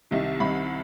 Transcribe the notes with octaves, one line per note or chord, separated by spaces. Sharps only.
C2 C3 D#3
C2 C3 D#3 B5